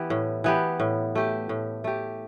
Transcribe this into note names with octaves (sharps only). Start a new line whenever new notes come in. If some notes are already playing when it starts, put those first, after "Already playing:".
Already playing: E3 B3 G4
A2
E3 B3 G4
A2
A3 G4
A2
A3 G4